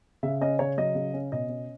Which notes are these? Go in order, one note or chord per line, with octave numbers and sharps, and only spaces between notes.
C#3 E5
C#4 D#5
C#3 C#5
F#3 D#5
C#3
C#4
B2 D#5
C#4